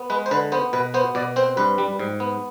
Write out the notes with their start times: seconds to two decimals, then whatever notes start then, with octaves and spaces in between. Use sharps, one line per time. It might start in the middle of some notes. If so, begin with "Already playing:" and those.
Already playing: B3
0.10 G#3 B4
0.26 C5
0.31 D3 B4
0.52 B3 C5
0.73 B2 B4
0.94 B3 C5
1.15 B2 D5
1.36 C4 C5
1.57 G2 B4
1.78 G3
1.99 G#2
2.20 B3